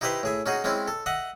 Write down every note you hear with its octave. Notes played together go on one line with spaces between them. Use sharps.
D#4 E4 G4 B4 C5 E5
A2 G#4 E5
C#4 D#4 F#4 G#4
G#3 C4 C#4 E4
A4
D#5 E5 F#5